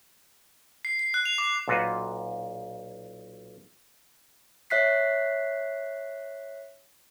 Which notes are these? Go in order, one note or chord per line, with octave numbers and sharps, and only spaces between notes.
C7
C7
F#6
F7
D6
B1 A#2 F4 F#4 B4
C#5 E5 F#6 B6 C7